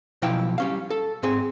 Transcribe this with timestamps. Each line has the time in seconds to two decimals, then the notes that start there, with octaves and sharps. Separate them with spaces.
0.22 B1 B2 F3 E4 F5 G5
0.58 G3 C#4 F5
0.90 A4
1.23 G#2 C4 G#4